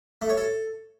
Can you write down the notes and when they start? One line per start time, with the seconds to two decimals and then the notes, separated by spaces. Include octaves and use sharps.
0.22 A3
0.29 C#5
0.37 A4